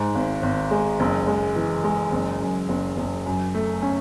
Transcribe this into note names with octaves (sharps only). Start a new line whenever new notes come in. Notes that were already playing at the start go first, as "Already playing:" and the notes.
Already playing: G#2
G#1
G#1
G#3
F#1
G#3
E3
G#3
F#1
F#2
F#1
F#1
F#2
A3
C#4